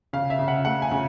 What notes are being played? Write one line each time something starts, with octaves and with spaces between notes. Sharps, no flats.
C#3 F5
E5
C#3
F#5
A3 F#5
G#5
C#3